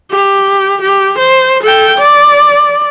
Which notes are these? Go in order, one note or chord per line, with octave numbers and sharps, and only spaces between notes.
G4
G4
C5
A4 G5
D5